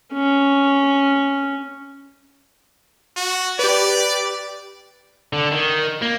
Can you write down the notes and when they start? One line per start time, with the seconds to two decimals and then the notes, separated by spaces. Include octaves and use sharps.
0.13 C#4
3.17 F#4
3.59 G4 B4 D5
5.32 D3
5.52 D#3
6.02 A#3